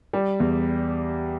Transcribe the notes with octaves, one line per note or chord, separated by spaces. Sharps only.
G3
E2